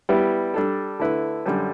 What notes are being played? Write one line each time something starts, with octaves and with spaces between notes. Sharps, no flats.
G3 B3 E4 G4
G3 D4 A4
D3 A3 E4 B4
F#2 D3 G3